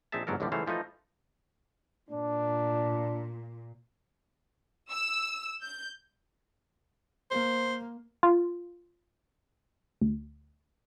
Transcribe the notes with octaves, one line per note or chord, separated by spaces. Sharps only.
A#1 C4 D#4 G#4 E5 A5
G1 G#2 F#3 A4 A#4
A1 D#2 A2 D3 F3 G3
C#2 E3 F#3 A3 C5 F5
E3 F3 A3 D#4 D#5
A#2 D4
E6
G6
A#3 C5
F4
D2